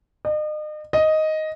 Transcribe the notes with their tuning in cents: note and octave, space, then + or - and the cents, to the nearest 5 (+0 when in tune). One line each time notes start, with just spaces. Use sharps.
D#5 -40
D#5 +5